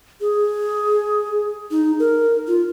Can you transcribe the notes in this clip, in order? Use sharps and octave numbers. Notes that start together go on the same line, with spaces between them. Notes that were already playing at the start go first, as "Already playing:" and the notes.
G#4
D#4
A#4
F4